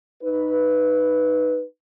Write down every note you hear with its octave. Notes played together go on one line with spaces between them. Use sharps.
D#4 B4